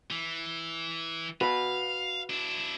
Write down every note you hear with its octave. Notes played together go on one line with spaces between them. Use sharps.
E3
F#4 B4 F5
D4 E4